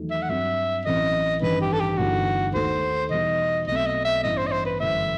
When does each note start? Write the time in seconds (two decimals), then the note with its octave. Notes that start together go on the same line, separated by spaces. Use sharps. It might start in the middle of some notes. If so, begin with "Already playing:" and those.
Already playing: E2 D#3 F#3 A3 D#4
0.10 E5
0.22 F#5
0.29 G2 F#3 C4 E5
0.85 A1 A2 F#3 C4 D#5
1.42 A1 G2 D#3 B4
1.61 G4
1.73 A4
1.80 G4
1.98 G1 G2 E3 A3 D#4 F#4
2.54 D#2 D#3 A3 D#4 C5
3.11 E2 B2 G3 D#4 D#5
3.67 B1 B2 A3 C4 D#5
3.77 E5
3.86 D#5
4.05 E5
4.23 A1 G2 E3 B3 E4 D#5
4.37 C5
4.47 D#5
4.51 C5
4.65 B4
4.80 G1 F#2 E3 A3 E5